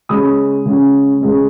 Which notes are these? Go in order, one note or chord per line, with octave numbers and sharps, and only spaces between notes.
C#3 G#3 C#4 B5 D#6
C#3 G#3 C#4
C#3 G#3 C#4